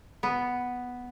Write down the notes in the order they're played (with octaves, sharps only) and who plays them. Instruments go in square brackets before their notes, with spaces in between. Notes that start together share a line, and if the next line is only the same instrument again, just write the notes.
[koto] B3